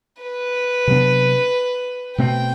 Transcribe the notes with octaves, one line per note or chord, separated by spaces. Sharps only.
B4
C3 F#3 B3 D4
B2 A3 C4 G5